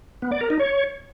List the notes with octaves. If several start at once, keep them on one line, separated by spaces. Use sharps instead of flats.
B3
D5
A#4
D#4
C#5